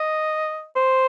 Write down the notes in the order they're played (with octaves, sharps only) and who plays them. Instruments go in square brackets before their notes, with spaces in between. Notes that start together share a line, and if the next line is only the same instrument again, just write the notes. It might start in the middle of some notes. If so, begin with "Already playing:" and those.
Already playing: [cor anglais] D#5
C5